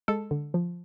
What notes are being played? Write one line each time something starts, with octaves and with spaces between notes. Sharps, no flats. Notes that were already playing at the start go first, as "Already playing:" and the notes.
G#3 A4
D3
F3